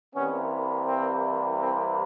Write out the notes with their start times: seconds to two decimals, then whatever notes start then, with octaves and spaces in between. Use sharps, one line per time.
0.15 C2 C3 E3 G3 A#3 B3 C#4
0.87 C4
1.60 C4